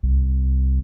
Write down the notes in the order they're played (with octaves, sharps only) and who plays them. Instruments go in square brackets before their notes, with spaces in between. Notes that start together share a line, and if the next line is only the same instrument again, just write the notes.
[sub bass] C2